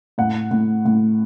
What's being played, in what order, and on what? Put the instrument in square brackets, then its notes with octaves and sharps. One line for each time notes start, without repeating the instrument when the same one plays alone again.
[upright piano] A2 F#5
A2
A2